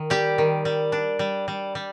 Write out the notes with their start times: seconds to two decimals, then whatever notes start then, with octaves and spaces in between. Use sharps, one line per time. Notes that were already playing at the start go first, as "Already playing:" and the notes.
Already playing: D#3
0.10 G3 G4
0.38 D#3
0.65 G3
0.92 D4
1.19 G3
1.48 G3
1.75 G3